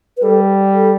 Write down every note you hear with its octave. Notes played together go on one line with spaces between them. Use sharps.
B4
G3 A4
A4